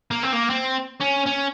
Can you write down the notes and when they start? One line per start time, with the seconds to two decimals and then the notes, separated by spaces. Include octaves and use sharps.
0.11 A#3
0.23 C4
0.33 A#3
0.50 C4
1.01 C#4
1.27 C#4